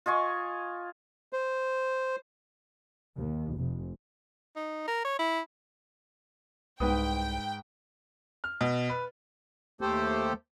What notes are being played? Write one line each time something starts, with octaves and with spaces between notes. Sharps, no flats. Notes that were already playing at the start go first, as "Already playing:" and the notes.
F4 D#5 G#5 C#6
C5
D#2
F1
D#4
A#4
C#5
E4
C2 G#2 B4 G5 D#6
F6
B2
B4
D#2 A3 G4 A4 C5